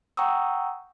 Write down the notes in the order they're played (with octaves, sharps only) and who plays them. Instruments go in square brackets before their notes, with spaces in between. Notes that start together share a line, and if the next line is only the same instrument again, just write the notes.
[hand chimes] F#5 G5 A#5 C#6 D#6 E6